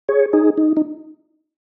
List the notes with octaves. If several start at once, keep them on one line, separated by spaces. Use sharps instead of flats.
G#4 C#5
D#4 G#4
D#4
D#4